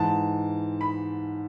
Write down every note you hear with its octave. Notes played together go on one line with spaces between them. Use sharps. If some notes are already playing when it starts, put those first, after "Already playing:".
Already playing: G#2 E3 A5
B5